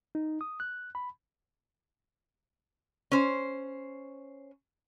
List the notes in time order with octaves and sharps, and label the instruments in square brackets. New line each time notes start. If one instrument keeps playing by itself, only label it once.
[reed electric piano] D#4
D#6
F#6
B5
[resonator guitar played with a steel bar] C#4 C5